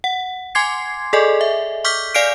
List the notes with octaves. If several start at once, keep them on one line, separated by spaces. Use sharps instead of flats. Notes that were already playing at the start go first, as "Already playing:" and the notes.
F#5
G#5 C6 D6 G#6 C7
G#4 A4 D5 D#5 G#5
E5
C#6 D6 F6 G6 B6
D5 F5 G#5 F6 C7 D7